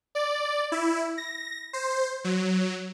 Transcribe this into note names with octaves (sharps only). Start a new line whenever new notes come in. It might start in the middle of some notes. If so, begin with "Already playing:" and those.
D5
E4
A#6
C5
F#3